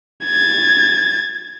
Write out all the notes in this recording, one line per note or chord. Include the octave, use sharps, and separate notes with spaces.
G#6 A6